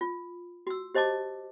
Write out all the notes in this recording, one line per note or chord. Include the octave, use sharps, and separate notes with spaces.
F4
F#4 E6
G4 C5 D#5 A5 D6